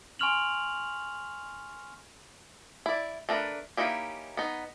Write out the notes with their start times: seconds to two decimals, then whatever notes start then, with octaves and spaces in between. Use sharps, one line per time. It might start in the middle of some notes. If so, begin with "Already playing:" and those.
0.19 G#5 C6 C#6 F6 F7 F#7
2.86 E4 D5
3.29 A3 D4 A#4 B4
3.77 A#3 C#4 D#4 E4 G4
4.37 B3 D#4